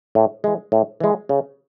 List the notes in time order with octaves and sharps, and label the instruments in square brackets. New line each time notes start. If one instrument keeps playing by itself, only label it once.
[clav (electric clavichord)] A2
E3 G#3
A2
E3 G#3
C#3